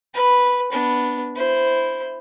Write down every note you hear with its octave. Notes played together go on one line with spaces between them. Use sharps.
B4
B3 D4
E4 C5